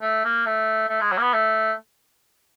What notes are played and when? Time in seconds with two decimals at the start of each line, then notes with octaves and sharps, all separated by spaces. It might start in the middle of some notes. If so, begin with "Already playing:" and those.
0.02 A3
0.25 A#3
0.46 A3
0.89 A3
1.01 G#3
1.12 F#3
1.18 A#3
1.22 B3
1.33 A3